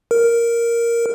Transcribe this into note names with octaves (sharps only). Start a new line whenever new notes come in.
A#4